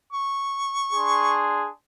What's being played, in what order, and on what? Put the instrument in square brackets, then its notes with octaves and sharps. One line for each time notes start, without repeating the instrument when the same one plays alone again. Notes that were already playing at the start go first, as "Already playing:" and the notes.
[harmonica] C#6
[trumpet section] D4 G#4 C6